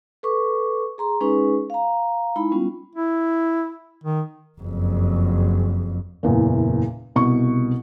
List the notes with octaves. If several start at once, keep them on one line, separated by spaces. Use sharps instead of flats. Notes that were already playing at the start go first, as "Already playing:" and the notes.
A4 B4 C#6 D6
G#4 A#5 C6
G#3 C#4 D#4 G#4 B4 C#6
F5 A#5
G#3 D#4 E4 B5
G3 B3 C#4 F4
E4
D#3
F#1 F2
F#1 E2 A#2
C2 B2 C#6